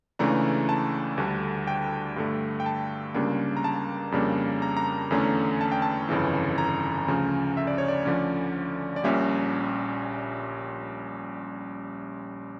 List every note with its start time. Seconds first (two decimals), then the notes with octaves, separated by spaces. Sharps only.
0.19 C#2 C#3 E3 A3 D4 A#5
0.69 A5
1.17 D2 D3 G3 D4
1.67 G5
2.16 G2 D3 A3
2.60 G5
2.66 A5
3.14 C#2 C#3 G3 A#3 D4
3.57 A#5
3.64 A5
4.12 F2 C#3 G3 A#3 D4
4.62 A#5
4.77 A#5
5.11 E2 D3 A3 C#4
5.61 A5
5.72 G5
5.82 A5
6.09 G1 F2 C#3 E3
6.58 A#5
7.08 D2 C#3 F3 C#4
7.57 E5
7.67 D5
7.78 C#5
7.88 D5
8.05 D2 D3 F3 C#4 D5
8.96 D5
9.04 A#1 A#2 G3 C#4 E5